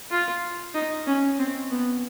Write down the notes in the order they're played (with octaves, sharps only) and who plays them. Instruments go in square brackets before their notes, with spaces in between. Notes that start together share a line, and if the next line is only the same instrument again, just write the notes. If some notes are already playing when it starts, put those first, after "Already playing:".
[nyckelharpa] F4
D#4
C#4
C4
B3